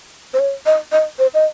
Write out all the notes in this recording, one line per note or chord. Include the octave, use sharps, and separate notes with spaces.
C5
C#5
D#5
D#5
C5
D#5